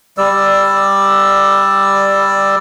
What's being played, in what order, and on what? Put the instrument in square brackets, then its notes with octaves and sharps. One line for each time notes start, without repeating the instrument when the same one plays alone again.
[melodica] G3 D5 E6